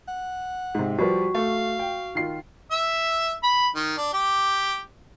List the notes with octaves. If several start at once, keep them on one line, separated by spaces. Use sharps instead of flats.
F#5
G#2 C3
F3 G3 F#4 B4 D5
A3 F5
G5
D#3 F4 C7
E5
B5
D#3
D4
G4